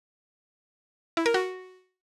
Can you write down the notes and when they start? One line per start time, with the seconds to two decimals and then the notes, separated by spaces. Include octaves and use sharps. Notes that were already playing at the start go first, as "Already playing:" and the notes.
1.17 E4
1.26 A#4
1.34 F#4